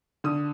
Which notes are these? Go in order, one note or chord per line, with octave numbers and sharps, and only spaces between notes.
D3 D#6